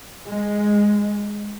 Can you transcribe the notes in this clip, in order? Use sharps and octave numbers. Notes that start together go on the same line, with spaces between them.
G#3